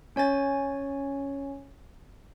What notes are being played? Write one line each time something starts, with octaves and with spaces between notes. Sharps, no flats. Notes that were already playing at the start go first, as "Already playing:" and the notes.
C#4 C#5 G#5 A6